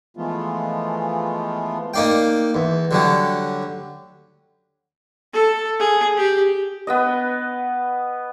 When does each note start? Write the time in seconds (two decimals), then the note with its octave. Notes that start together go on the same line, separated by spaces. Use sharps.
0.17 E3 F3 G#3 A3 B3 F4
1.94 A#3 D#4 D5 F5 G5
2.54 E2
2.91 D3 F#3 G3
5.33 A4
5.79 G#4
6.17 G4
6.87 B3 B4 D#5